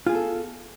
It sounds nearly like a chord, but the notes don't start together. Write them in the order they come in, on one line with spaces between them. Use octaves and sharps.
F4 G#4 B3 A4